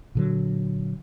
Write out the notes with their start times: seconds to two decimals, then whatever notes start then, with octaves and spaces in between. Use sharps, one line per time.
0.15 A#2 D3 F#3